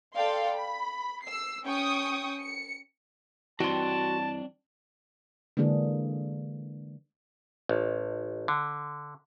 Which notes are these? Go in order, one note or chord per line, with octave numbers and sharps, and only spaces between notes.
A4 D5 F5 G5 C6
B5
E6 C7
C#4 G5 C#6 D#6
C#7
G2 E3 C4 D4 F#4 G5 A5 C6
D3 E3 G#3 A#3 D4 G#4
A1
D3